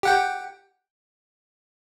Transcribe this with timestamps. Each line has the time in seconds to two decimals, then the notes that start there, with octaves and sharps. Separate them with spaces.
0.03 G4 F#5 G5